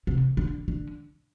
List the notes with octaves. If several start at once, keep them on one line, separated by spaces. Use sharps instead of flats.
C3
D3
D3